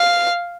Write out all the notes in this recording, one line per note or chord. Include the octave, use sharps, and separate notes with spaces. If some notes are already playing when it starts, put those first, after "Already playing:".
Already playing: F5